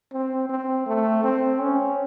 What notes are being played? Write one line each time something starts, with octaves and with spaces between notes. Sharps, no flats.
C4
C4
A3
C4
C#4